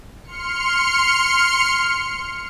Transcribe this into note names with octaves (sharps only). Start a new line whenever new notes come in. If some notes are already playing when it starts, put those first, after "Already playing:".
C6 F6 C#7